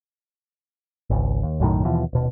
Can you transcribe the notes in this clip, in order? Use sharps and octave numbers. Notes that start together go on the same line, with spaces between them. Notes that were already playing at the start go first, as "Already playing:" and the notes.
G#1 C#2
D#2
B1 F#2 A2 D#3
D#2 B2 E3 F3
D#1 B2